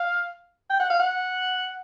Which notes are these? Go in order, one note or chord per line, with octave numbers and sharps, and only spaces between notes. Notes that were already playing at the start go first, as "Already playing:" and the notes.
Already playing: F5
G5
F#5
F5
F#5